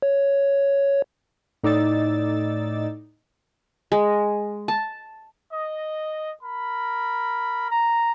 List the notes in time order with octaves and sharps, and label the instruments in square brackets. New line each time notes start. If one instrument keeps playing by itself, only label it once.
[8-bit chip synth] C#5
[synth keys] A2 D#4 D5 E6 A6
[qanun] G#3
A5
[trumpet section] D#5
A#4 B5
A#5